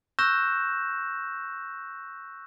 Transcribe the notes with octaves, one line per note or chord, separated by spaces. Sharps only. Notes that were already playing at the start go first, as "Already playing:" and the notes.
C#6 E6 F#6 G6 A#6 E7